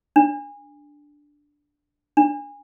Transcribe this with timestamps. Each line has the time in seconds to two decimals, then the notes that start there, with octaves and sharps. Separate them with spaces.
0.16 D4
2.17 D4